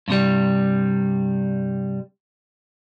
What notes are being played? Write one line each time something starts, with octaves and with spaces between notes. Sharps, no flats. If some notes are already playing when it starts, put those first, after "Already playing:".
G2 C3 G3